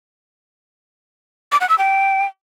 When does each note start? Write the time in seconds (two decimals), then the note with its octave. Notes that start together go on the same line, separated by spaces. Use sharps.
1.52 D6
1.61 F#5
1.69 E6
1.78 G5